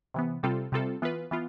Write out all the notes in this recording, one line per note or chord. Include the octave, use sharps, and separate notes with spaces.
C3 E3 B3
C3 G3 C4 F4 A4
C3 G3 C4 F4 A4
E3 B3 F4 B4
E3 B3 F4